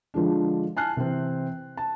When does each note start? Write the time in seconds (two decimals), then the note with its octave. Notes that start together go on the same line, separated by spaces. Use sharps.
0.14 D3 F3 G#3 D4
0.77 G#5 A5 F6 F#6 C7
0.97 C3 E3 C4
1.77 A5